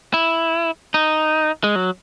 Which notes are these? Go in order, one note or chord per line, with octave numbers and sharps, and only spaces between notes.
E4
D#4
G#3
F#3